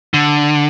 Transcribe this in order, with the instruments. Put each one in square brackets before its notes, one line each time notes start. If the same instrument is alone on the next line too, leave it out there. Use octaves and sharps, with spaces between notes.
[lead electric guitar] D3